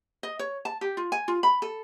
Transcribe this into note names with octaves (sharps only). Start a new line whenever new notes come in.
D#5
C#5
A5
G4
F4
G#5
F4
B5
A4